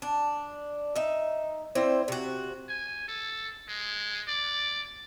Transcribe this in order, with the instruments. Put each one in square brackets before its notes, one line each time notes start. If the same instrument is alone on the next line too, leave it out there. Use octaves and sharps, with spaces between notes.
[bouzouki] D4
D#4 E5
C4 E4 C5 D5
C3 F#4
[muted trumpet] G#5
A4
G#3
D5